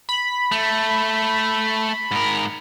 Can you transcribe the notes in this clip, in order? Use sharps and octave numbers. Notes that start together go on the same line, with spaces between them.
B5
A3
G#2 A#4